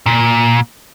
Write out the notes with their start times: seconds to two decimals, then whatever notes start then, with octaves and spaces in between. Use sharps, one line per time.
0.06 A#2